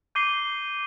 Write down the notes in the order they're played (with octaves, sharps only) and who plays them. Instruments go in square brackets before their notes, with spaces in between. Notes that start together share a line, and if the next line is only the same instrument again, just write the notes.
[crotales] D6 G6 C7 D#7 G7